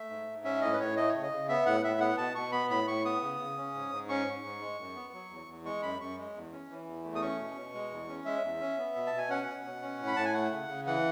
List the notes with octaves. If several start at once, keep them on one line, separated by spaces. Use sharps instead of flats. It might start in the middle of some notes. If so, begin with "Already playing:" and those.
Already playing: A3 E5
G#2
G#2
C#4 E5
A2 D#5
B4
A2 C#5
A3 D#5
C#3 C#5
D#5
C#3
B3 E5
A2 F#5
A2 E5
B3 F#5
B2 A5
B2 C#6
B3 B5
A2 B5
A2 C#6
B3 D#6
C#3
C#3
C#4
G#2
G#2
C#4 C#6
G#2
G#2
G#3
F#2
B3
F#3
E2
E2
G#3 C#6
F#2 B5
F#2 C#6
G#3
E2
C#4
E3
E2
A3
D#6
C#4 C#6
B2
B2
G#3
E2
C#4
G#3 E5
E2
C#4
B3
B2
A5
B2
G#5
C#4 F#5
B2
B2
C#4
A2
B5
A2 A5
G#5
A3 F#5
C#3
C#3
E3 F#5